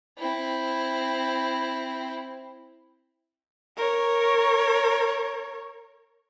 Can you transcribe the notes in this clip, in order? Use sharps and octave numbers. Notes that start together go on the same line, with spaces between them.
C4 E4
A#4 C#5